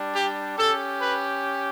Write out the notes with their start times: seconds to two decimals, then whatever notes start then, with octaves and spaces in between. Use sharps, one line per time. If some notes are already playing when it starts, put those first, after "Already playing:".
Already playing: G3 D4
0.15 G4
0.58 C#4 G4 A4
1.01 B4